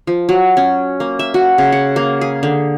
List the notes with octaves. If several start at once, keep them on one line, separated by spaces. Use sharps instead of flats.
F3
F#3
C#4
A#3
E5
F#4
C#3
F#5
A#3
G#4
D3